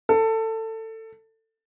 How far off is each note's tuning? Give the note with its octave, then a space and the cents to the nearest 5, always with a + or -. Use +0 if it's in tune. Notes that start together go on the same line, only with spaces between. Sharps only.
A4 +20